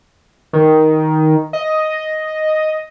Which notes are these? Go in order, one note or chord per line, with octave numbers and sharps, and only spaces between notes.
D#3
D#5